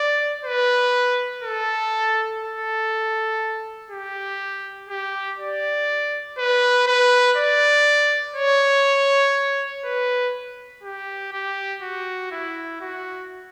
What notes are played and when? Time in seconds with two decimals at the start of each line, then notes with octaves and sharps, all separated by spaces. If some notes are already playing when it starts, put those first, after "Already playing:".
Already playing: D5
0.44 B4
1.44 A4
2.43 A4
3.91 G4
4.89 G4
5.39 D5
6.38 B4
6.87 B4
7.37 D5
8.36 C#5
9.84 B4
10.83 G4
11.32 G4
11.82 F#4
12.31 E4
12.81 F#4